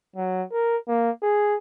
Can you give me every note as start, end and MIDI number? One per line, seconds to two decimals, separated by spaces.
0.16 0.43 54
0.52 0.77 70
0.88 1.11 58
1.23 1.55 68